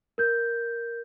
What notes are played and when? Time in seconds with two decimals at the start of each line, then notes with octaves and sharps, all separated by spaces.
0.18 A#4 G6